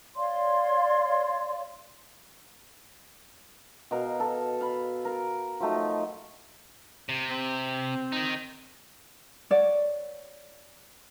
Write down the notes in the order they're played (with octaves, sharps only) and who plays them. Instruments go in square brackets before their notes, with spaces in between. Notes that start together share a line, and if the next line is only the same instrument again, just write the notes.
[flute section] C#5 D5 F5 C6
[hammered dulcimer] B2 A#4 F5
A4
F5 B5
A#4 F5
F3 F#3 A3 D#4
[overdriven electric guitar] C3
[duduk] C4
[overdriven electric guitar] D#3 D#4
[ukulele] C#5 D5 F#5